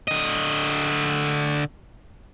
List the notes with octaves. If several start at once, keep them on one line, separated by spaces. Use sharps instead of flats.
D3 D#5